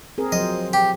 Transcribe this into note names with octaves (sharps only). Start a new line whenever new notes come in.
C4 G#4 A#4
F3 F#3 C5 D#5
G4